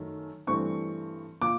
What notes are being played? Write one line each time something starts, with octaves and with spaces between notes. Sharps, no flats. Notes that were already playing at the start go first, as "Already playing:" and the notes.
Already playing: F#2 D#3 F#3 A3
G2 E3 A3 C4 C#6
A#2 F3 D6